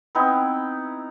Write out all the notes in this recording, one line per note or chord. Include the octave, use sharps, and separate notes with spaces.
B3 C4 D#4 E4